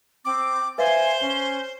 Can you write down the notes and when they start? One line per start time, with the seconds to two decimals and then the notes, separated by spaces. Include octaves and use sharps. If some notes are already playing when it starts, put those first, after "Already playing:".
0.25 C4 D6
0.78 B4 C5 E5 F5 G#5
1.21 C#4 G7